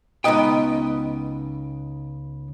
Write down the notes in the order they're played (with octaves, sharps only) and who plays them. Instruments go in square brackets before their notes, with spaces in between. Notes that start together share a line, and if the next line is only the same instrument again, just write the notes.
[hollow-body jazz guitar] C#2 B3 D#4 B4 D#5 G5